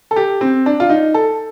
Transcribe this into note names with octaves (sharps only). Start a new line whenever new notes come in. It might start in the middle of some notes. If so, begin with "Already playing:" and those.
A4
G4
C4
D4
F4
D#4
A4